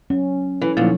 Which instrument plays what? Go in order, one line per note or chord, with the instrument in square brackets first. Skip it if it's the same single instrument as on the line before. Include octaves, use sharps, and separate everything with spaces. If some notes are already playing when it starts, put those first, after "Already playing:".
[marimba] F#3 [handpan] C#4
[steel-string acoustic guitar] E3 [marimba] A4
[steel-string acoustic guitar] D2 A#2 [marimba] F3 F#3 D#4 [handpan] C#5